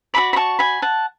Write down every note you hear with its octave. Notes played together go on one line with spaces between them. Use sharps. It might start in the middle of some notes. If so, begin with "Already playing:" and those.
F#4 A4 D5 B5 D6
B5
A5 C#6
G#5 B5
F#5 A5